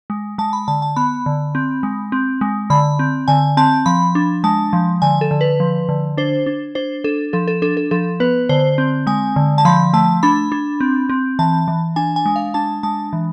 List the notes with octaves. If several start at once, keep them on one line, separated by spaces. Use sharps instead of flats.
G#3
G#3 A5
B5
D3 A5
A5
B3 B5
D3
C4
G#3
C4
G#3
D3 B5
C4
D3 G#5
C4 A5
F3 B5
D4
G#3 A5
F3
D3 G#5
A4
D3
B4
F3
D3
D4 C5
D4
D4 C5
D4 A4
F3 A4
A4
D4 A4
A4
F3 A4
B3 B4
D3 C5
C4
G#3 G#5
D3
A5
F3 B5
A3 A5
D4 B5
D4
C4
C4
E3 A5
E3
D4 G#5
G#5
G#3
F5
D4 A5
G#3 A5
E3